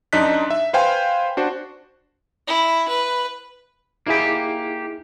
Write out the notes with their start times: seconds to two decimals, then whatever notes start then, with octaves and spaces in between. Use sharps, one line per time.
0.13 F#2 D4 D#4 D#5 F#6 B6
0.50 E5
0.73 B4 C5 F5 G5 G#5 C6
1.37 D4 F#4 C5
2.47 E4
2.89 B4
4.07 A#3 D#4 E4 G4 G#4